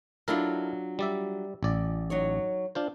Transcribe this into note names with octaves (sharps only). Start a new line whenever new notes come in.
F#3 D4 E4 F4 A4 A#4
G3 D5 E5
A1 D5
F#3 D#4 C#5
D4 F4 C5